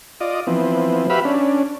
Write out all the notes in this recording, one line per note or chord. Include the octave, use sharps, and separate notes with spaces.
F4 D5 D#5
E3 F3 B3 C4
F#4 G4 B4 E5 F5 B5
C#4 D4